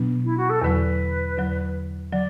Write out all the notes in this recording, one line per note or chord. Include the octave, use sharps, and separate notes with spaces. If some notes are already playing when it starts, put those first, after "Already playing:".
Already playing: B2 F#3 B3 D4
E4
F#4
A4
E2 D3 F#3 B4
E2 D3 F#3
D3 F#3 D5